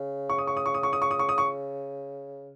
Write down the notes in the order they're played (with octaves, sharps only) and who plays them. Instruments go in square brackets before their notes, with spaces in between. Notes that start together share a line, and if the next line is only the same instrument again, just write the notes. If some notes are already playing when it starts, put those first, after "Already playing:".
Already playing: [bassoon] C#3
[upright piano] C#6
D#6
C#6
D#6
C#6
D#6
C#6
D#6
C#6
D#6
C#6
D#6
C#6